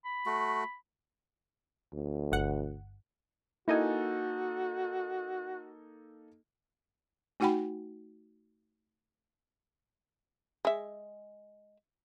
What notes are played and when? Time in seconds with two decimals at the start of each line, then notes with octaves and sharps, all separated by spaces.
0.04 B5
0.26 A3 F#4
1.93 D2
2.32 G1 F#5
3.68 A#3 D#4 E4 F#4 A4 D#5 G#5
7.40 A3 D#4 F#4 F#5 G5 B5
10.65 G#3 E5